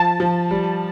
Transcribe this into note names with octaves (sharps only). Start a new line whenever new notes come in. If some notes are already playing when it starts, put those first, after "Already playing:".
Already playing: F3 A5
F3
G3